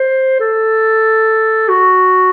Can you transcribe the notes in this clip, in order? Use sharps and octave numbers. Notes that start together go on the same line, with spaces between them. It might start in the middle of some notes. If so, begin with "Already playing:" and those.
Already playing: C5
A4
F#4